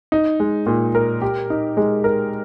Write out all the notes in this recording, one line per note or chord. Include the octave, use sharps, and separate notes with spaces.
D#4
G#3
A#2
A#4
G4
D#4
G#3
A#4